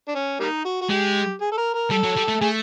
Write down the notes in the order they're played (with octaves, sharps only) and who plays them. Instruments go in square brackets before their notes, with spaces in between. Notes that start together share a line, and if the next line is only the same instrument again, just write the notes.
[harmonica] D4
C#4
G3 A#3 D#4
F#4
F#4
[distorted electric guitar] G#3 [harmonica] G4
[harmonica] G#4
A4
A#4
A#4
[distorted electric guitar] G3 [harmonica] A4
[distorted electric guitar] F#3
G3
A3
[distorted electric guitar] A3 [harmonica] G#4